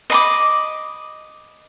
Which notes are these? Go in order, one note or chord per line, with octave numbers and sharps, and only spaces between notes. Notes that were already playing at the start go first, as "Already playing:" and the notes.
D#5 B5 D6